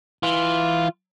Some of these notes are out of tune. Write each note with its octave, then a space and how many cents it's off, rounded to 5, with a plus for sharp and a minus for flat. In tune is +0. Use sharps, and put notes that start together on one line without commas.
E3 +0 F4 +0